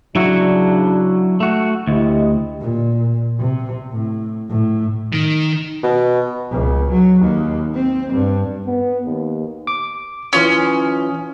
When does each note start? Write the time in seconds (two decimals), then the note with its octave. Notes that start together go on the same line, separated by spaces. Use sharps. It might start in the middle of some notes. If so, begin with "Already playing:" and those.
0.16 C#3 F#3 D4 E4 F#4
1.40 A3 F#4
1.87 D2 E4 G4 D#5
2.61 A#2
3.39 C3
3.92 A2
4.49 A2
5.13 D#3
5.83 B2
6.51 C#2
6.91 F#3
7.21 D#2
7.74 C4
8.13 G2
8.66 B3
9.06 D#2
9.67 D6
10.33 E3 C#4 F4 D#6